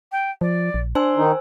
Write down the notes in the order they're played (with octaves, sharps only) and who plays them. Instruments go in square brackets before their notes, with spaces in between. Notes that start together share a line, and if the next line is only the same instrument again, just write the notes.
[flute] G5
[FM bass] F3 [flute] D5
[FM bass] A#1
[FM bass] D4 [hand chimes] C5 G#5 E6 [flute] C6
[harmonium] D#3 D#4